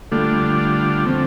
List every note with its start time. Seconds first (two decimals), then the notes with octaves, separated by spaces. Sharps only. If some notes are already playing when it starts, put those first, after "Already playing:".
0.11 D3 G3 A3 D4 F4
1.05 D3 F3 A3 C4